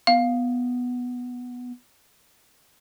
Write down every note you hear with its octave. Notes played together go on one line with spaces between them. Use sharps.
B3 F5